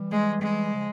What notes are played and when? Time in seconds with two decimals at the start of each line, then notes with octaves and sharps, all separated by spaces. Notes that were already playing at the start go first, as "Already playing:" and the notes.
Already playing: E3 G3
0.11 G#3
0.42 G#3
0.71 C#3 F3